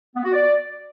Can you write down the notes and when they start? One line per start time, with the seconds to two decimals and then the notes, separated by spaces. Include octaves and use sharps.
0.15 B3
0.24 F#4
0.33 D5